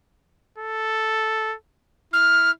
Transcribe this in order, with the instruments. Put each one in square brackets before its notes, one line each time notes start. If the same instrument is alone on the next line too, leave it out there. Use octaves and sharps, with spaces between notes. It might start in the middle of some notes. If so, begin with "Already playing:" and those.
[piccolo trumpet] A4
[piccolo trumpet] E4 [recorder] F6